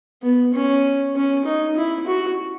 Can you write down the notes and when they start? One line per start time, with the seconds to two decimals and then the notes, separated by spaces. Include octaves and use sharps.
0.23 B3
0.54 C#4
1.16 C#4
1.45 D#4
1.77 E4
2.07 F#4